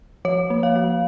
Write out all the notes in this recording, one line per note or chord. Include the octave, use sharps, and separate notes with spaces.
F3 C#5
A#3
F5
F3